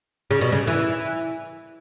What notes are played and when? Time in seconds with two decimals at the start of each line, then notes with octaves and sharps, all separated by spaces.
0.31 C#3
0.41 B2
0.52 C#3
0.67 E3